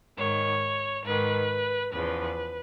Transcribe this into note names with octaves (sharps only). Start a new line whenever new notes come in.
G#2 D#3 C#5
G#2 D#3 B4
E2 C#3 F3 B4